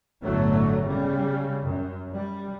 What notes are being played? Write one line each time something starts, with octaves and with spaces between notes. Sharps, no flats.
G1 D2 A2 D3 F#3 A3
C#3 G3
F#2
G3